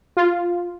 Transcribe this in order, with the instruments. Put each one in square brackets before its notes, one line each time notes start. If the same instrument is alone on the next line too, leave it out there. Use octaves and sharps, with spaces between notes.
[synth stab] F4